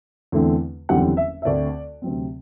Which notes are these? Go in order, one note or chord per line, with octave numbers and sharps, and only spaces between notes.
E2 D3 A3 C4
F#1 E2 D3 G3 C4 F#5
E5
E5
D2 D3 A3 C4 D5
D2 C3 F#3 C4